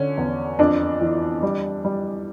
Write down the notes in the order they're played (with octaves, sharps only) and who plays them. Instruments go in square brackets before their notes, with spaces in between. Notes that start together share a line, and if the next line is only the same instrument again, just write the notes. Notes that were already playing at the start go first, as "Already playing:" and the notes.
Already playing: [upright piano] D3 C#4
E2
F2 D4
E3
G3
G3